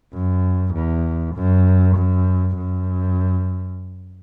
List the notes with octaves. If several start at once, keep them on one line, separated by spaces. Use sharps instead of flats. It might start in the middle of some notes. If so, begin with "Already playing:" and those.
F#2
E2
F#2
F#2
F#2